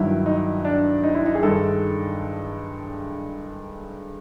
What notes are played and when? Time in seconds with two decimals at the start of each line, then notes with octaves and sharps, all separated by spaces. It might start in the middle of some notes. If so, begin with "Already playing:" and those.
Already playing: G2 D#3 F#3 E4
0.26 D#4
0.65 D4
1.03 D#4
1.15 E4
1.26 D#4
1.35 G#4
1.43 G2 D#3 G#3 A4